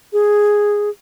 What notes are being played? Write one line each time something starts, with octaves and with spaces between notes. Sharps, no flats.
G#4